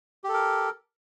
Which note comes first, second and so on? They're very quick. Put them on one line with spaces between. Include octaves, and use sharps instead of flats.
G4 A4 A#4